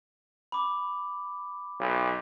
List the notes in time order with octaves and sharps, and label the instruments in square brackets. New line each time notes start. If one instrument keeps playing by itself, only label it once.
[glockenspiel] B5 D6
[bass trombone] B1